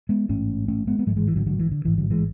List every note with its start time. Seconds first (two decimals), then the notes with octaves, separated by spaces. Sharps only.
0.09 G#3 B3
0.29 A1 G#2 A3 C#4
0.68 A3 C#4
0.87 G#3 B3
0.99 B3
1.07 A1 G#2 F#3 A3
1.16 E3 G#3
1.27 E3
1.36 D3 F#3
1.46 D3 F#3
1.59 E3
1.72 D3
1.85 A1 G#2 E3
1.98 D3 F#3
2.10 E3 G#3